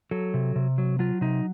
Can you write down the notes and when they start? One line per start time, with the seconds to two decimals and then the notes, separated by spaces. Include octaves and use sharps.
0.11 F#3 A4
0.34 C3
0.56 C3
0.78 F#3
0.99 F#3 F4
1.21 C3 D#4